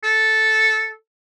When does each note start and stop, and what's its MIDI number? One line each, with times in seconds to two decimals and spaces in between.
0.04 0.91 69